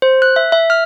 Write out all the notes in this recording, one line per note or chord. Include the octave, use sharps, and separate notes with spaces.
C5
F#6
E5
E5
F6